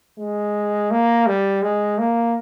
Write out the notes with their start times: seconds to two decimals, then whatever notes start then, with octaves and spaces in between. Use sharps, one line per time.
0.19 G#3
0.90 A#3
1.26 G3
1.62 G#3
1.98 A#3